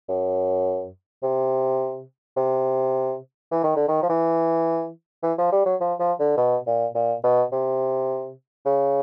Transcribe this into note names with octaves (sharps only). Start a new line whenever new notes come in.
F#2
C3
C3
E3
D#3
D3
D#3
F3
E3
E3
F3
G3
F#3
F3
F3
D3
B2
A#2
A#2
B2
C3
C#3